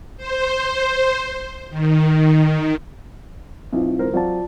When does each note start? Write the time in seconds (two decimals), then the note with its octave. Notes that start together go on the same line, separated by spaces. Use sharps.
0.17 C5
1.70 D#3
3.73 B1 C4 E4 F4
3.99 E1 A#4 C5
4.14 F#3 C4 F4 D5 F5 A5